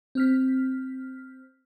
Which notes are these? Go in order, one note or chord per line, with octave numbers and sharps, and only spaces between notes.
C4 F6 B6